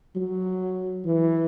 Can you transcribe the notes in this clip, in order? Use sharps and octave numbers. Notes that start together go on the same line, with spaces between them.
F#3
E3